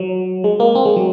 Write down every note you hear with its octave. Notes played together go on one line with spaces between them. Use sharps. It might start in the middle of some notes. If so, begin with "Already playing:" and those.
Already playing: F#3
G#3
A#3
C4
G#3
F#3